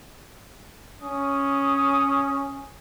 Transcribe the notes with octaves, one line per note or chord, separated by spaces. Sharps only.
C#4 D#6